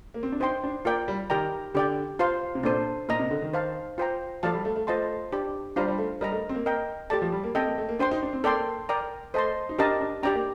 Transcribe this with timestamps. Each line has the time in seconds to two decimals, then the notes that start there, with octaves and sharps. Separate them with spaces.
0.14 A#3
0.23 C4
0.32 D4
0.40 D#4 C5 G5 C6
0.64 D4
0.85 A#3 F4 A#4 D5 G5
1.08 G3
1.30 D#3 G4 A#4 D5 G5 A#5
1.74 D3 G4 D5 G5
2.19 F4 C5 F5 C6
2.55 C3
2.63 A#2 D4 A4 C5
3.09 A#2 A#4 D#5 A#5
3.19 C3
3.31 D3
3.42 D#3
3.54 C5 F5 A5
3.98 F4 C5 G5 A#5
4.43 F3 A4 D5 F5 A5
4.54 G3
4.65 A3
4.76 A3
4.87 A3 F4 C5 D#5 A5 C6
5.32 D4 G4 D5
5.76 G3 D4 F4 C5 F5 A#5
5.88 G3
5.98 A3
6.21 G3 A#4 D#5 A#5
6.32 A3
6.49 C4
6.55 A#3
6.66 A#4 D#5 G5
7.10 A3 G4 D5 A5
7.22 F3
7.32 G3
7.43 A#3
7.55 C4 A4 D#5 G5
7.66 A#3
7.78 A3
7.89 A#3
7.99 D4 C5 G5 C6
8.11 D#4
8.23 D4
8.33 C4
8.44 A#3 A4 D5 G5 C6
8.89 A#4 D5 G5 A#5
9.34 A3 C5 D#5 A5 C6
9.69 D#4
9.78 D4 G4 A#4 D#5 A5
10.01 D4
10.23 D4 G4 D5 G5 A#5
10.34 A#3